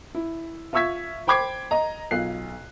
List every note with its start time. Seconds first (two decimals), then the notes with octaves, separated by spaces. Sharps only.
0.15 E4
0.73 F4 E5 C#6 E6 G#6 B6
1.27 C5 G5 B5 D6 G#6 C7
1.71 D#5 A#5
2.11 B1 F4 F#6 C7